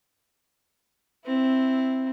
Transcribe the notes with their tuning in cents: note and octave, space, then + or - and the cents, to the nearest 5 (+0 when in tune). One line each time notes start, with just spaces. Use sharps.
C4 +0 E4 +0